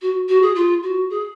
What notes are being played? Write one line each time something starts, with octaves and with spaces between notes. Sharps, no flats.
F#4
F#4
G#4
F4
F#4
G#4